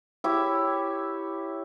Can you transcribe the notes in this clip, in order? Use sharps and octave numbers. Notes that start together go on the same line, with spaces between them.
E4 G4 C#5